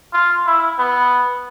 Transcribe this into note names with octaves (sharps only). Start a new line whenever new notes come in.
F4
E4
B3